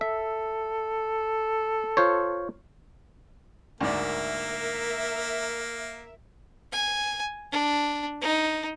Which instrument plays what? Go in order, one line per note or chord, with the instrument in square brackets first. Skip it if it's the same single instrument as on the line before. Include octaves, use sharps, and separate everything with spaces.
[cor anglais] A4 [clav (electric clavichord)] E5
[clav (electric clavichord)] F4 C5 C#5
[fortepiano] D2 G#2 D5 [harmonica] A#3 [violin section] A#4 E5
[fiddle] G#5
D4
D#4